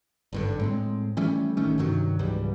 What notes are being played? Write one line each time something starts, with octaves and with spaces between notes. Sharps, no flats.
G#1 G2 D3
A2 G#3 C4
E3 G3 A3 C#4
A1 D#3 A3 C#4
G2 C3 D#3 F#3
C#2 G#2 E3 G3